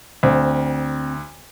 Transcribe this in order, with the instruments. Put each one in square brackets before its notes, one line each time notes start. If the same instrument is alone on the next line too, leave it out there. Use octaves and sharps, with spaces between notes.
[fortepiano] D2 [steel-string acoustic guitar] C4